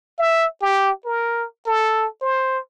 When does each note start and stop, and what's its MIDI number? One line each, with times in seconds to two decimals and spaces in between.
0.18 0.46 76
0.61 0.90 67
1.05 1.45 70
1.66 2.06 69
2.21 2.59 72